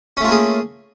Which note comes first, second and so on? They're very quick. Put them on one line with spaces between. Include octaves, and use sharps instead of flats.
C#4 A3 F4 A#3 G#4